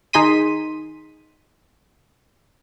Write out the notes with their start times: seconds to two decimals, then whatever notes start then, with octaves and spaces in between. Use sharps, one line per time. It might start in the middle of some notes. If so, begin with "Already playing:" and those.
0.13 D#3 D#4 G#4 C6 B6 D#7